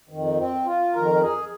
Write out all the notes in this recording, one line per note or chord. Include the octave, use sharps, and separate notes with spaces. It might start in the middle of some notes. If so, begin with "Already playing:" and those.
F2 D#3
C4
F4
F2 D#3 A#4
G#4